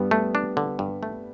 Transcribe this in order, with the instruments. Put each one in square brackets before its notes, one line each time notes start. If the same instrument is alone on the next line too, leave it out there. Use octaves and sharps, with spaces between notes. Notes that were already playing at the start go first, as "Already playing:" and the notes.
Already playing: [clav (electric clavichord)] G2 [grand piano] G3 B3
[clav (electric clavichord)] A3
D4
D3
G2
A3